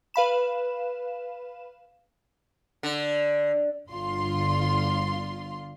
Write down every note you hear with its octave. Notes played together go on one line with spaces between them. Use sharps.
B4 F5 B5 E7
D3
G1 D3 F4 C6